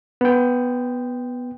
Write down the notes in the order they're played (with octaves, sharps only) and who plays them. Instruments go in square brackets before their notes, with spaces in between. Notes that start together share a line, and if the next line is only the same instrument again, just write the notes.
[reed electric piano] B3 G5